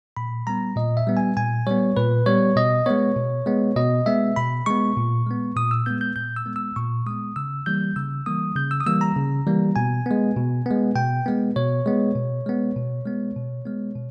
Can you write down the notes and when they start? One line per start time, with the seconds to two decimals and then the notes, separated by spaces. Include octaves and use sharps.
0.17 A#2 B5
0.47 G3 B3 A#5
0.76 A#2 D#5
0.97 E5
1.07 G3 B3
1.17 G#5
1.37 A#2 G#5
1.67 G3 B3 C#5
1.97 A#2 B4
2.26 G3 B3 C#5
2.56 B2 D#5
2.86 G#3 B3 C#5
3.17 B2
3.46 G#3 B3
3.76 B2 D#5
4.06 G#3 B3 E5
4.36 B2 B5
4.66 G#3 B3 C#6
4.97 A#2
5.27 G#3 B3
5.56 A#2 D#6
5.71 E6
5.86 G#3 B3 G6
6.01 G6
6.16 A#2 G6
6.36 E6
6.46 G#3 B3
6.56 E6
6.76 A#2 C#6
7.06 G#3 B3 D#6
7.36 C#3 E6
7.66 E3 G3 A#3 G6
7.96 C#3 E6
8.26 E3 G3 A#3 D#6
8.56 C#3 G6
8.71 E6
8.81 D#6
8.87 E3 G3 A#3 E6
9.01 A#5
9.16 C#3
9.47 E3 G3 A#3
9.76 B2 G#5
10.06 G#3 B3
10.37 B2
10.66 G#3 B3
10.96 B2 G5
11.26 G#3 B3
11.56 B2 C#5
11.86 G#3 B3
12.16 B2
12.46 G#3 B3
12.76 B2
13.06 G#3 B3
13.36 B2
13.66 G#3 B3
13.96 B2